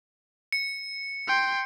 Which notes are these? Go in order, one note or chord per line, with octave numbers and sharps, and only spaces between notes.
C#7
G5 C6